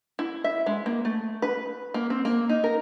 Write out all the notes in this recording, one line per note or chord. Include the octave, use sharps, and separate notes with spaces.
E4
E5
G#3
A#3
A3
B4
A#3
C4
A#3
D#4
A#4